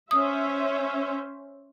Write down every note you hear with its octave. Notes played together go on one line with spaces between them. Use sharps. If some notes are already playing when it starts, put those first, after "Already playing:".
C#4 C5 E5 D#6